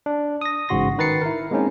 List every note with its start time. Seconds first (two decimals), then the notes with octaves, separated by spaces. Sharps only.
0.06 D4
0.41 D#6 A#6
0.69 A1 G#2 C#3 F#4 C6 A#6
0.98 D#3 B4 A#5 A6 C7 C#7
1.22 E4 A#4
1.51 G#3 A#3 C4 C#4 D#4